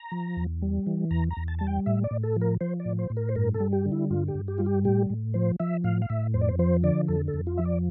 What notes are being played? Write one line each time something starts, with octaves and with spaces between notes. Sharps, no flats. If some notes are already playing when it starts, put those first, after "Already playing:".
Already playing: A#5
F3
E2
G3
E3
E2 A#5
A#5
E2
A5
G3 A5
G5
A2 E5
D5
A2
A4
F3
A#4
F3 C5
D5
A2
C5
A2
A#4
C5
G2 A#4
A4
G3
G4
D3
E4
G2 F4
G4
G2
G4
G3 F4
G4
A2 G4
A2
F3 C5
F3 E5
A2 F5
F5
A2 E5
F2 C5
D5
C5
F3 C5
D3 D5
F2 A4
A4
F2
F4
F3 E5
D5